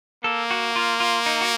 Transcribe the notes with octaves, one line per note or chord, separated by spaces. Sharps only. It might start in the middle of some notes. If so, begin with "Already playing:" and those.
A#3 A4
F#4
F4
F4
D#4
F#4